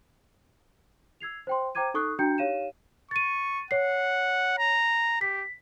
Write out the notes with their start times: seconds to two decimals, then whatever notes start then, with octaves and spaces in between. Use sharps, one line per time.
1.21 E6 G#6 C7 F7
1.47 C5 G5 C6
1.75 C5 G5 A#5 D6 G#6 D#7
1.94 D#4 A4 C#6 D#6 F#6 C7
2.19 D4 F#4 G5 A#5 G6 C#7
2.38 D#4 G4 C#5 F5 D#7 E7
3.11 C#6 A6 D#7
3.71 C#5 F#5 C7
4.59 A#5
5.21 G4 B6